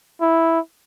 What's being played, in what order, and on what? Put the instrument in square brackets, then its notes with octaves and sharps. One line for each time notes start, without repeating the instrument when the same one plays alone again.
[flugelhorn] E4